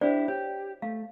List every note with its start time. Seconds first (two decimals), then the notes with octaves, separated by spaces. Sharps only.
0.01 D4 E4 G4 C5 D5 G5
0.28 G4 C#5
0.82 A3 F5